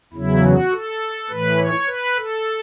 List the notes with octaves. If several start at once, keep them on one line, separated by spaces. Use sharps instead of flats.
E2 C#3 F#3 E4
F#4
A4
A2 E3 B4
C#5
B4
A4